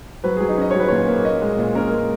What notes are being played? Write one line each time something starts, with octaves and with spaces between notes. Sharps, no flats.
F#3 B4
G#4
F#3
D#4
C#4 D#5
F#3 C#5
B4
A#2 C#5
A#3
A#2 D#5
G#3
A#2
C#4 A#4
G#3